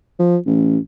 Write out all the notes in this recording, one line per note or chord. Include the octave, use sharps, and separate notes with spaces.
F3
A1